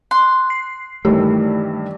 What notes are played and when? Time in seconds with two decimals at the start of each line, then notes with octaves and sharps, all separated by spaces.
0.11 C6 F#6
0.50 C7
1.05 G2 D#3 E3 A3 G4